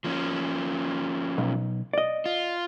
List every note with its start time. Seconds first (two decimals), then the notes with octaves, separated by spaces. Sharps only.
0.04 F3 A#3 C#4
1.38 B1
1.93 D5 D#5
2.26 F4